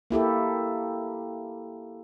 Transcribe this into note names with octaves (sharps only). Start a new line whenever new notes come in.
A#3 E4 G4 A4